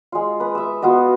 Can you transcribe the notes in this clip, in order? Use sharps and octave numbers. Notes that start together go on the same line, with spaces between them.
G#3 F4
B4 D#6
E5 E6
B3 F4 F#4 D#5